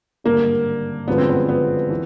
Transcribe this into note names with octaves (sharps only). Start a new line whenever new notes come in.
G#1 G2 D3 A#3
G1 F#2 D3 F3 G#3 B3
C4
B3
B3
E3